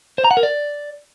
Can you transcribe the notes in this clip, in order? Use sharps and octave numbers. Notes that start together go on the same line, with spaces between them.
C5
A#5
F#5
A#4
D5